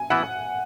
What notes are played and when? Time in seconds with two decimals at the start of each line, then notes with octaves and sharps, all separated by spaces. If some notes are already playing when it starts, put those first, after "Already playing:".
Already playing: G#5
0.10 E3 B3 E4 F#5